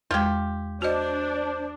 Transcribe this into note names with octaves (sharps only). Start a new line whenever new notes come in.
E2 G#3 F4 G4
D4 F#4 C5 D#5